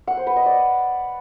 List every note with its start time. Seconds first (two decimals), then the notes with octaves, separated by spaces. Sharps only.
0.07 F#5
0.17 C5
0.27 B4
0.36 D#5
0.46 D5